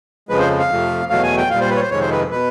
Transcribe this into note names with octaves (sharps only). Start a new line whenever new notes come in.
F2 C#3 F3 G#3 B4
C5
F5
F2 C3 F3 A3
E2 B2 F#3 A3 F5
G#5
G5
A#2 G3 F5
C5
B4
C#5
C5
F2 C3 D#3 G#3 C#5
C5
B4
B2 B4